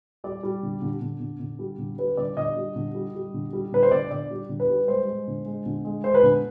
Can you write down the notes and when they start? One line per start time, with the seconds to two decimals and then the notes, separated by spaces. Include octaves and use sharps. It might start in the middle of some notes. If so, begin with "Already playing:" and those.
0.24 G3 D5
0.43 G3
0.63 D3
0.82 D3
1.02 D3
1.20 D3
1.40 D3
1.59 G3
1.79 D3
1.98 G3 B4
2.17 D3 D5
2.37 D3 D#5
2.56 G3
2.76 D3
2.95 G3
3.15 G3
3.34 D3
3.53 G3
3.72 D3 B4
3.83 C5
3.91 D3 D5
4.11 D3 D5
4.31 G3
4.49 D3
4.60 B4
4.69 G3
4.88 G#3 C5
5.07 G#3
5.28 D3
5.46 G#3
5.66 D3
5.85 G#3
6.04 G#3 C5
6.14 B4
6.23 D3